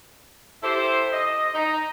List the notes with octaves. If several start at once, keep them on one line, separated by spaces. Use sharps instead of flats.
E4 G4 A4 C5
D#5
D#4